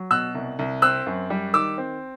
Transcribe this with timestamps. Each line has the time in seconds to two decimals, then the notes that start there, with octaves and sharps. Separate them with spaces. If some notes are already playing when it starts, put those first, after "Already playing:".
Already playing: F#3
0.11 B2 E6 F#6
0.35 C2
0.59 C2
0.82 C4 E6 F#6
1.07 F#2
1.30 G3
1.53 D#3 D6 E6
1.78 C4